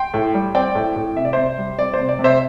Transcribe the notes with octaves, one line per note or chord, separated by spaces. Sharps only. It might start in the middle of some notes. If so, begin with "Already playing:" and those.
Already playing: G5 C6
A2
G3
C4 D5 G5
A2
A2
C3 E5
D5
C3 C5 E5
G3
C4 D5
C5
C3
D5
C3
C5 E5